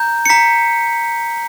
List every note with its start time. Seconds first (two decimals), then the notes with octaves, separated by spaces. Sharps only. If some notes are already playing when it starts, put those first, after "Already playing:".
Already playing: A#5 G6
0.26 C#7
0.29 A#5 B6